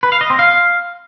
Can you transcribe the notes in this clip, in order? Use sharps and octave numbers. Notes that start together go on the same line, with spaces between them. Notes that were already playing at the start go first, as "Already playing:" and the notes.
B4
F5
D#5
C4
F5